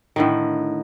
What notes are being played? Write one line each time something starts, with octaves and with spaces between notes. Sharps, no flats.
A2 D3 D#3